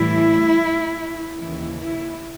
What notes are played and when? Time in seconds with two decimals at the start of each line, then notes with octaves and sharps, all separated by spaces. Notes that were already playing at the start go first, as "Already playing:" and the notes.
Already playing: A2 E3 G3 E4
1.38 D#2 C#3 E3 E4
1.78 E4